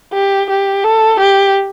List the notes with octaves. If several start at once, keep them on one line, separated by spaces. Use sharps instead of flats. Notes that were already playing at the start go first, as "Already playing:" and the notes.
G4
G4
A4
G4